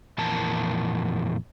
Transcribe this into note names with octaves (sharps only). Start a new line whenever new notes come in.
F2 A#2 E3 A#4 A5